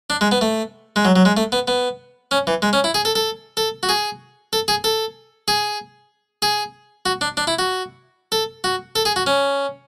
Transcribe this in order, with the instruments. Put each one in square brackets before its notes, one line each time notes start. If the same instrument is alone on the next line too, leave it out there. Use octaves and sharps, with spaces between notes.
[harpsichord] D4
G#3
B3
A3
G#3
F#3
F#3
G#3
A3
B3
B3
C#4
E3
G#3
C#4
E4
G#4
A4
A4
A4
F#4
G#4
A4
G#4
A4
G#4
G#4
F#4
D4
D4
E4
F#4
A4
F#4
A4
G#4
F#4
C#4